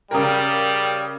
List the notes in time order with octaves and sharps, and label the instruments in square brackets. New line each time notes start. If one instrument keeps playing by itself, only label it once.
[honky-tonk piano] C#3 A#4 [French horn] G3